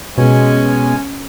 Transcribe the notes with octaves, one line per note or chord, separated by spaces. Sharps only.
B2 G#3 C#4 G#5